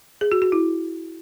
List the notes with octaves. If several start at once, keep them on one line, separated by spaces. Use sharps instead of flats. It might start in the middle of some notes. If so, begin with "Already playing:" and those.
G#4
F#4
F#4
E4